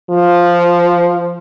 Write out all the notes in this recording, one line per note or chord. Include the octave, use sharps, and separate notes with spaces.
F3